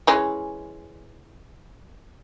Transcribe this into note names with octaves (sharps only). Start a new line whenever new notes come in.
E3 G#3 C#4